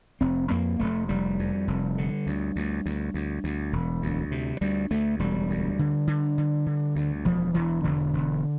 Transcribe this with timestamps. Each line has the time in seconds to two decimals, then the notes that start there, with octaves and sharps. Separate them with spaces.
0.21 F1 C4
0.50 F2 A#3
0.80 F1 A3
1.09 F1 G3
1.39 F2
1.68 F1
1.98 D3
2.27 D2
2.56 D2
2.86 D2
3.14 D2
3.44 D2
3.73 E1
4.02 D2
4.31 C3
4.61 D2 G3
4.91 D2 A3
5.19 E1 G3
5.50 D2
5.79 D3
6.07 D3
6.38 D3
6.66 D3
6.95 D2
7.25 E1 F3
7.54 E1 E3
7.84 E1 D3
8.14 E1